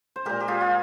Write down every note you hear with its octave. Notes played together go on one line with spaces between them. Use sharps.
C5
A#2 G#3 G4 A#4
G4
F4 G#4
F4